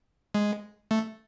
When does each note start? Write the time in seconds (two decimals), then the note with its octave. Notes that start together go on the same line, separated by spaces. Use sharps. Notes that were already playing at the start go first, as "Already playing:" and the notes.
0.35 G#3
0.91 A3